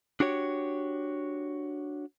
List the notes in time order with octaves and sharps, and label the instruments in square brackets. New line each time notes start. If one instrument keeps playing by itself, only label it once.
[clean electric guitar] D4 F#4 G4 C#5